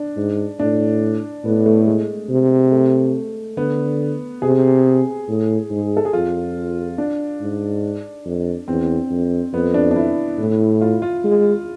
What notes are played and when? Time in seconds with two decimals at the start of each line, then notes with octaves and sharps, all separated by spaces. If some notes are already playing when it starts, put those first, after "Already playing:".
Already playing: D4
0.17 G#2
0.59 A2 D4
1.45 A2 B3
1.66 A3
1.87 G#3
2.30 C3
2.72 A3
3.57 D3 B3
4.42 C3 G#4
5.28 A2
5.70 G#2
5.97 A4
6.05 G#4
6.13 F2 F4
6.98 D4
7.41 G#2
8.26 F2
8.68 E2 C4
9.11 F2
9.53 F2 B3
9.74 D4
9.91 D4
9.96 E4
10.39 A2
10.81 F4
11.02 F4
11.24 G#3